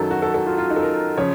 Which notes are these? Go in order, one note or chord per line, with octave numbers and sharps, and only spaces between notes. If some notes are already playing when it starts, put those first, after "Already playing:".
Already playing: F#2 D#3 F#3 A4
F#4
A4
A4
F4
F4
D#4
A4
A#4
C#3 F3 C#5